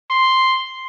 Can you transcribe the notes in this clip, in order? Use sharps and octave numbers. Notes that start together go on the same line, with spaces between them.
C6